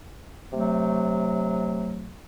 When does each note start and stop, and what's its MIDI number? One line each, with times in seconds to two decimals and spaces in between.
0.53 2.11 48
0.53 2.11 54
0.53 2.11 57